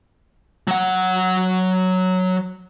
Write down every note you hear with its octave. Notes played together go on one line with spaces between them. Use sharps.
F#3 F#5